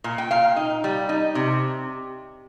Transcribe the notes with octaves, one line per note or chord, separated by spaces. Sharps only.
A#2
G5
A#2 F5
D#4
G3
D#4
C3